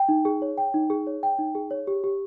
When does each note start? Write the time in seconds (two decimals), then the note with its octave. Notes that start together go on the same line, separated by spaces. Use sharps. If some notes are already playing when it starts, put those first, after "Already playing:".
Already playing: G5
0.09 D#4
0.25 G#4
0.42 C#5
0.58 G5
0.74 D#4
0.90 G#4
1.07 C#5
1.23 G5
1.39 D#4
1.55 G#4
1.71 C#5
1.87 G4
2.04 G4